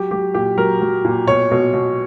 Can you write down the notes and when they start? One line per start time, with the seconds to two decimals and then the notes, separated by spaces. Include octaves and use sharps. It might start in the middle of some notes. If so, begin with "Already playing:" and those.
Already playing: F#3 G4
0.11 F#3 G4
0.34 A#2 G4
0.57 F#3 A#4
0.81 F#3
1.05 A#2
1.27 B2 C#5
1.51 B2
1.73 B2